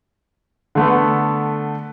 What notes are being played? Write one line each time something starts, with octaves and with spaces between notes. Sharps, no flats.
D3 A3 B3